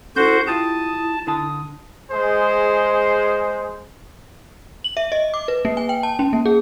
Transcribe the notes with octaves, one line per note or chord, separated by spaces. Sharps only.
C#4 E4 F#4 A4 C5 G6
E4 F4 G4 A5 D#6
D3 A5 D#6
G#3 G#4 C5
F#7
E5
D#5
D6
B4
A#3
G#5
G5
A5
C#4
A#3
G#4